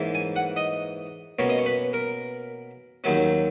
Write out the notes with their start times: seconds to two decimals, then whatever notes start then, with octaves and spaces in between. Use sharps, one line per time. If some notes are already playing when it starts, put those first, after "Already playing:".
Already playing: G#2 E3 A#3 C#4
0.15 G#5
0.36 F#5
0.56 D#5
1.39 B2 A#3 C#4 C#5
1.49 D#5
1.58 C#5
1.66 B4
1.93 A#4
3.04 D#2 D#3 F#3 C#4